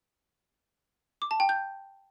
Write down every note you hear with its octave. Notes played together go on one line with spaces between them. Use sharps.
D6
A5
G5
G6